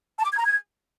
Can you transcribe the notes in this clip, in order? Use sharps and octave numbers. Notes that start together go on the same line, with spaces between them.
A5
D6
G#6
A#5
G#6